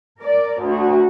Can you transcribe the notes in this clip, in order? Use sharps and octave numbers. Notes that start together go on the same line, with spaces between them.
A#4 D5
D2 F#4